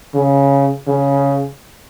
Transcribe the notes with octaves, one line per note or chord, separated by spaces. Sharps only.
C#3
C#3